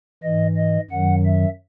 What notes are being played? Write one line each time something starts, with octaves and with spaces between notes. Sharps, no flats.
G#2 E3 D#5
D#5
F#2 D#3 F#3 F#5
E5